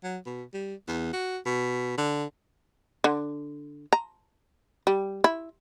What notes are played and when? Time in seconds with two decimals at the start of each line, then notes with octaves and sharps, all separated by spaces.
0.03 F#3
0.26 B2
0.54 G3
0.88 E2
1.13 F#4
1.45 B2
1.98 D3
3.04 D3
3.93 A#5
4.87 G3
5.24 E4